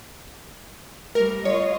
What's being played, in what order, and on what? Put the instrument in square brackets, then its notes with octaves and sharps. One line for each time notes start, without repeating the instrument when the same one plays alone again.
[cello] G3 A3 [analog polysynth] A#4
[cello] F4 D#5 [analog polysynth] C#5